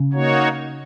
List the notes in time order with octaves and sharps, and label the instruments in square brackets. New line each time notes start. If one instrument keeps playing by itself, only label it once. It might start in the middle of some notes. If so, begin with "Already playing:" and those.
Already playing: [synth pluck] C#3
[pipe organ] A#3 D#4 F#4 C#5